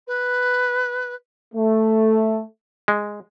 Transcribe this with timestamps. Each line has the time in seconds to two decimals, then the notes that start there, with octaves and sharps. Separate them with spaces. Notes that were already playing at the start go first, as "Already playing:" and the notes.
0.07 B4
1.55 A3
2.88 G#3